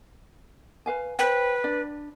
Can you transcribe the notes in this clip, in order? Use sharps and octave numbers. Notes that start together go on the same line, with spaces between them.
B4 F5 G#5
B4 C5 G5
D4 D5